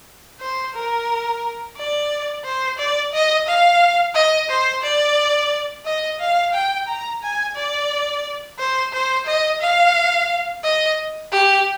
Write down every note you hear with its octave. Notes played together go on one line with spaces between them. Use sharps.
C5
A#4
D5
C5
D5
D#5
F5
D#5
C5
D5
D#5
F5
G5
A#5
G#5
D5
C5
C5
D#5
F5
D#5
G4